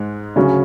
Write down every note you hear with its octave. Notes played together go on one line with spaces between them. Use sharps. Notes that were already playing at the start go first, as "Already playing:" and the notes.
Already playing: G#2 G#3
D2 C#3 F#3 C#4